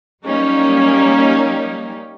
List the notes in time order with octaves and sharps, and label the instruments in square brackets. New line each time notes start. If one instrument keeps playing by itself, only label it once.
[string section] F#3 G3 A#3 C#4 D#4 G4